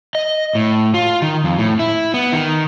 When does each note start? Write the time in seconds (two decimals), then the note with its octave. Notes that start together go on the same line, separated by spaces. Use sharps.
0.15 D#5
0.55 A2
0.94 F4
1.22 D#3
1.44 F2
1.59 A2
1.79 E4
2.14 B3
2.33 D#3